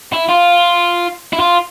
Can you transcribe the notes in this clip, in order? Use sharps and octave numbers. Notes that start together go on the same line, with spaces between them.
E4
F4
E4
F4